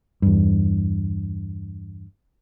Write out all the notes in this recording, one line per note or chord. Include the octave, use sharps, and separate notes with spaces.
E2 G2